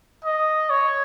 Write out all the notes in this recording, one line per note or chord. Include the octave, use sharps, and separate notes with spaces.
D#5
C#5